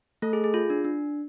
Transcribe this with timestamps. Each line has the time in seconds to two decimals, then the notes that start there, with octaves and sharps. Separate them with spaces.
0.22 A3 A4
0.33 G#4
0.44 G#4
0.54 F4
0.70 D4
0.84 D4